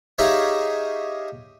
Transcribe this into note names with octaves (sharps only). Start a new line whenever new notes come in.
D#4 G4 G#4 C#5 E5 F5